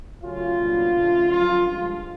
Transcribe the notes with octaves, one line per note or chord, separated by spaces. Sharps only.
C#3 F#3 A3 C#4 F4
C2 A#2 F#3 B3 D4
C#3 F3 A3 D4
F#2 D3 F3 F4
G2 D3 F3 G#3 F4